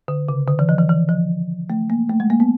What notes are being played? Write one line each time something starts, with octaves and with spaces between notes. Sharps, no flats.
D3
C#3
D3
E3
F3
E3
E3
F3
A3
A#3
A3
G#3
A#3
B3